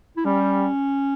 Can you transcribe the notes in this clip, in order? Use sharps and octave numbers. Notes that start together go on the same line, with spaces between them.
E4
G3 C#4